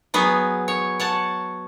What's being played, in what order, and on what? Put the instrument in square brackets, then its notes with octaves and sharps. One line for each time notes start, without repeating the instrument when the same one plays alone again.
[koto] F#3 B3 G#4
C#5
C#5 F#5 A5